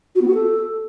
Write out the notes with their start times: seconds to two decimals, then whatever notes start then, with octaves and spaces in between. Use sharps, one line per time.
0.15 F#4
0.22 B3
0.28 F#4
0.34 A4